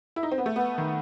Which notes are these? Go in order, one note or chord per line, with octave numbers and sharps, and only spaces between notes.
E4
D#4
C4
B3
A3
B3
D#3